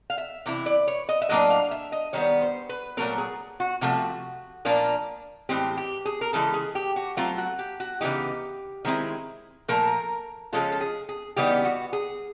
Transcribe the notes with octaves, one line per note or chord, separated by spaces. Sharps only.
F5
E5
C3 E3 E4
D5
C#5
D#5
E5
A2 F#3 A#3 D4 D#5
F5
E5
D#5
D#3 G3 B3 C#5
C5
B4
A#2 F#3 A3 C4 A#4
G#4
F#4
C3 F3 A3 F#4
A#2 F3 A#3 D4 F4
A2 E3 G#3 C4 G4
G4
G#4
A#4
C#3 E3 G#3 A4
G#4
G4
F#4
F#3 A3 C4 F4
F#4
G4
F#4
C#3 E3 G#3 B3 D#4 G4
D#3 G#3 C4 E4
A#2 F3 A3 A#4
C#3 F3 G#3 C#4 F4 A4
A4
G#4
G#4
C#3 E3 G3 B3 D#4 G4
F#4
G#4